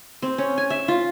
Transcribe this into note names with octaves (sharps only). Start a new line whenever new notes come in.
C4
C#4
G#5
E5
F4